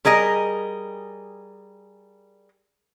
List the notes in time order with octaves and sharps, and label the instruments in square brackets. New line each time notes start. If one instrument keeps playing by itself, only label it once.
[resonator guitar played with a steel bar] G3 G#4 A#4 D#5